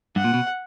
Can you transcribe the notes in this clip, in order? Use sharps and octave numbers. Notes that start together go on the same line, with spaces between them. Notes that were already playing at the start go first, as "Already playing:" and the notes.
G2 F#5
A#2
B2